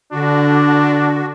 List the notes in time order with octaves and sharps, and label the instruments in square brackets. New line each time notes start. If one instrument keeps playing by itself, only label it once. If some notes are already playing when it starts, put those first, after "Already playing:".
[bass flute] D3 [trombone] D4 [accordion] F#4